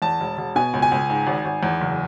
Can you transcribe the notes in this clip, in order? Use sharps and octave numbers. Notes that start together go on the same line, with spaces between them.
E2 A5
E1
E1
B2 G#5
C#2
G#5
C#2
G#2
G#1
G#1
E2
F#1